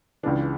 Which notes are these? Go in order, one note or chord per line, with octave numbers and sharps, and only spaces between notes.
C#2 C#3 E3 D4